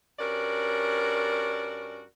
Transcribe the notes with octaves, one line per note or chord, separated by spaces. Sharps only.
G2 C#4 F#4 A#4 D5